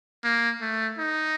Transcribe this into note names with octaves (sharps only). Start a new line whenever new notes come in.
A#3
A3
D#4